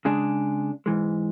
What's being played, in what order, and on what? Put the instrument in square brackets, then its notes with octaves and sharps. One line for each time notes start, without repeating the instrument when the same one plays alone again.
[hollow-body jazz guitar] C#3 G#3 D4 G#4
G#2 E3 G#3